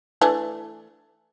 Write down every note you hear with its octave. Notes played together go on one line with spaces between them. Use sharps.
E3 A3 D4